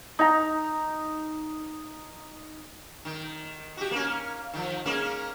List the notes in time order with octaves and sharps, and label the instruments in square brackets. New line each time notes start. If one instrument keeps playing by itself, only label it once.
[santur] D#4 A#5
[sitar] D#3
F#4 G4
A#3 C#4
D#3 F3
G#3 A#3 C#4